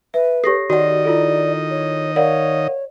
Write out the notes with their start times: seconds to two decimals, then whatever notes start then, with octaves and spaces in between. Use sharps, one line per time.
0.14 B4 E5
0.44 G4 A4 C#5 A#6 C7
0.70 D#3 F#4 D5 D#5 F#5
1.05 E4 F4 A4
1.70 C#5
2.16 A#4 C#5 D5 F5 F#5